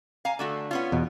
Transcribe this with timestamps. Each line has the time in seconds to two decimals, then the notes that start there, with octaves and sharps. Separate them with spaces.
0.25 F5 G#5 A#5
0.39 D3 A3 F#4
0.71 B3 C#4 F4
0.92 E2 B2